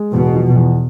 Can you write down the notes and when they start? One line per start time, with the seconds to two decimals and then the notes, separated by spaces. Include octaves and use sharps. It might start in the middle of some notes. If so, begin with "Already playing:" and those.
Already playing: G#3
0.13 E2 B2
0.34 F3
0.56 E2